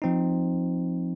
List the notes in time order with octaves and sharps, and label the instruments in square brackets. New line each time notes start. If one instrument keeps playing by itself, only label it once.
[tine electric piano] F3 C4 D#4